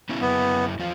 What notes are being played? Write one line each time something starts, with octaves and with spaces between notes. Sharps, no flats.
B3 C#4 E4
F#2 B3 E4
E2 F3 F4